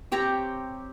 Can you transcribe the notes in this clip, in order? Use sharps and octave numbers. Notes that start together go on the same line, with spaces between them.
C4 G4 C#5 A#5